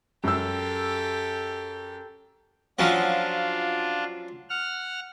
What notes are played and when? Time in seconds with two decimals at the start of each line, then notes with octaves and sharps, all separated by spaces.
0.24 F#2 G4 A4 E6
2.79 F3 F#3 C#4 D4 F4
4.49 F#5 F6